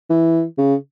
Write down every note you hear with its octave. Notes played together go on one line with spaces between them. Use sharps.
E3
C#3